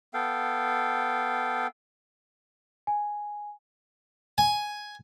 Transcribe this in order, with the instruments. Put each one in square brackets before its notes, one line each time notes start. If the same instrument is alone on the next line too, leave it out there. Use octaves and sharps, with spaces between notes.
[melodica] B3 A4 F5 G5
[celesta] G#5
[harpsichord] G#5